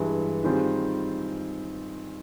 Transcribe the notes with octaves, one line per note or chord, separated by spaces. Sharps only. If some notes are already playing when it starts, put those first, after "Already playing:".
Already playing: G2 E3 G#3
D#3 G3 C4 F4 G#4